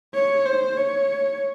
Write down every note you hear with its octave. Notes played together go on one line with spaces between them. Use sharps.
C#5
C5
C#5